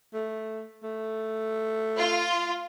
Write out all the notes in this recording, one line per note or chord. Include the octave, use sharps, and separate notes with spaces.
A3
A3
F4